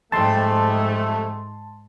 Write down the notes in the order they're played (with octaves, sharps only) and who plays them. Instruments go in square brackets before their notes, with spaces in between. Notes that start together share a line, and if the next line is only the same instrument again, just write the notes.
[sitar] F2 G3 [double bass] G#2 [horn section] A3 [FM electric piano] A5 C6